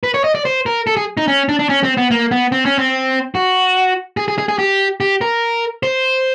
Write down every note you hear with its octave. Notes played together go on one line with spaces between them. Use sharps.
B4
C#5
D#5
D5
C5
A#4
A4
G#4
D#4
C#4
D4
D4
C#4
C4
B3
A#3
B3
C4
C#4
C4
F#4
G#4
G#4
G#4
G#4
G4
G4
A#4
C5